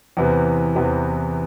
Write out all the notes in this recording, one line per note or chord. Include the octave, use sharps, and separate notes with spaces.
E2 C3 E3 B3
E2 C3 E3 B3